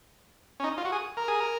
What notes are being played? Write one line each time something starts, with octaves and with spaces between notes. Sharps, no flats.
C#4
D#4
F4
F#4
G#4
A#4
G#4
A#4